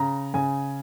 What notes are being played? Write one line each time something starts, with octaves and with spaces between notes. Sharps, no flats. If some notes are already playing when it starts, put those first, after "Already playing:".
Already playing: C#3 A#5
C#3 G#5